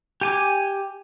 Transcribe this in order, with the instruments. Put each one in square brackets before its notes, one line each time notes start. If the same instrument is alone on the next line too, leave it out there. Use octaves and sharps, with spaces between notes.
[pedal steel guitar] G4 G#5 D6